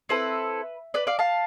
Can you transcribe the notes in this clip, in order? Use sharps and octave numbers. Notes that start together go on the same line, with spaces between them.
C4 E4 A4 B4
B4 D5
D5 F5
F5 A5